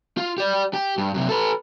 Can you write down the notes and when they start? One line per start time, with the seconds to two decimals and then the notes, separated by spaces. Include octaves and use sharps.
0.17 F4
0.38 G4 D5
0.74 G4
0.98 G2
1.14 F#2 C3
1.29 A4 B4